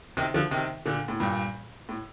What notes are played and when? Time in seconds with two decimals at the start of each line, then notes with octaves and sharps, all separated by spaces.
0.17 C3 D#3
0.34 D3 F3
0.51 C3 D#3
0.86 A#2 D3
1.08 A2
1.20 G2 A#2
1.89 A2